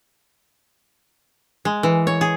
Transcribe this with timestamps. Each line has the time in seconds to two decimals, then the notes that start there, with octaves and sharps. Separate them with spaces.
1.65 G#3
1.83 E3
2.07 C#5
2.21 G#4